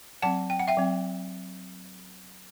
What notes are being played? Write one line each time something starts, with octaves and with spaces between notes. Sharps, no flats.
F#3 C4 F#5 A5
G5
F#5
E5 G5
F#3 C4